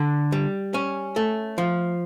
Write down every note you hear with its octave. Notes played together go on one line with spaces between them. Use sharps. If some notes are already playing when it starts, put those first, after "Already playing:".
Already playing: D3
G3
C#4
A3
F3